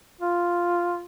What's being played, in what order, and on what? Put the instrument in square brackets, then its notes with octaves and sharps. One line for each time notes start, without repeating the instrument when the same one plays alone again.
[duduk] F4